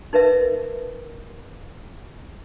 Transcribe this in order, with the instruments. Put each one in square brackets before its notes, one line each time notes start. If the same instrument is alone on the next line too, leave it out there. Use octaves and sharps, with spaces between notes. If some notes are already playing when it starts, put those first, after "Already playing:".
[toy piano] D#4 A#4 B4 E5